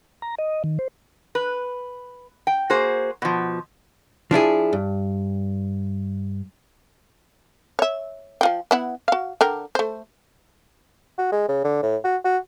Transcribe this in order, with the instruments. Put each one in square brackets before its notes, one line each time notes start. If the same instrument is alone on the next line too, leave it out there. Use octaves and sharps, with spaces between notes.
[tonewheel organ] A#5
D#5
D#3
C5
[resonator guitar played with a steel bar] B4
G5
A#3 F#4 G#4 C5
B2 F3
[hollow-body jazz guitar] F3 D4 E4 G#4
G2
[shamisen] C#5 E5
F3 F4 G5
B3 E4 F#5
F#4 F5
D3 A#4 G5
A3 C5
[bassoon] F#4
G#3
C#3
D3
A2
F#4
F#4